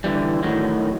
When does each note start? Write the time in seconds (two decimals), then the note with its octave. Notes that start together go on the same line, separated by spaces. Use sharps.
0.04 D3 E3 G3
0.43 A2 D#3 F#3